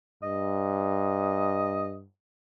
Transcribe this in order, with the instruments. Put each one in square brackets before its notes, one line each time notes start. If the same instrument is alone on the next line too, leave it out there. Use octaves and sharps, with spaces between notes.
[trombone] G2 [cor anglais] D#5